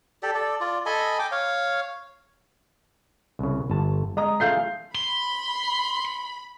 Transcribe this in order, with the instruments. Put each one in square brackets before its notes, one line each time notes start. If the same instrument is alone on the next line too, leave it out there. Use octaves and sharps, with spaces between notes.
[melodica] G4 A4 D5
A4 D5
F4 D5
A4 D#5 G#5 B5
G5 D6
C#5 F5
[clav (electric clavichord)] C2 C#3
G1 A5
[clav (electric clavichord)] G#3 [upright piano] D#5 A#5 D#6
[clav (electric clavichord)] A3 F4 G#4 [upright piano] F5 G6 C7
[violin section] B5 [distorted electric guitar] C6